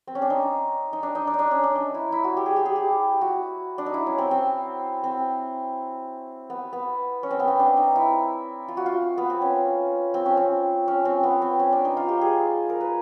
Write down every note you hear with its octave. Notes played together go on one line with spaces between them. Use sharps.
C4
C#4
D4
D#4
D#4
D4
D#4
D4
D#4
D4
C#4
D4
D#4
E4
E4
F#4
G4
G#4
G4
G#4
G4
F#4
D4
D#4
E4
C#4
C4
C4
C4
B3
B3
C#4
C4
B3
C4
D4
D#4
E4
F4
F#4
F4
B3
C4
C#4
C4
C#4
C4
C#4
C4
B3
C4
C#4
D4
D#4
F4
G4
G#4
A#4
B4